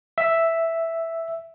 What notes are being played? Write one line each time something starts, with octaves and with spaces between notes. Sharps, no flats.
E5